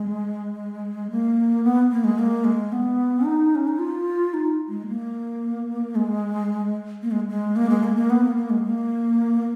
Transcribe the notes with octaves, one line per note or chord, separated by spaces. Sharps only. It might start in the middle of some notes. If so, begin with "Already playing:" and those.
Already playing: G#3
A#3
B3
A#3
G#3
A#3
G#3
B3
D#4
C#4
D#4
F4
D#4
G#3
A#3
G#3
A#3
G#3
G#3
A#3
G#3
A#3
A#3
B3
A#3
A#3
G#3
A#3